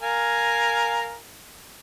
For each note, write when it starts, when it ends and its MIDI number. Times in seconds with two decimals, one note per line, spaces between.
0.02 1.16 70
0.02 1.16 77
0.02 1.16 80